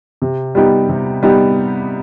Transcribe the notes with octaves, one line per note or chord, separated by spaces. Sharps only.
C3
G3 B3 D#4 G4
C3
G3 B3 D#4 G4